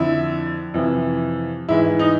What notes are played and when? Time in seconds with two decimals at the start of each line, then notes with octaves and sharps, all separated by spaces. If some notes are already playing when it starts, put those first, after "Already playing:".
Already playing: F2 D3 E4
0.74 F2 C3 E3
1.69 G#2 E3 E4
1.99 D#4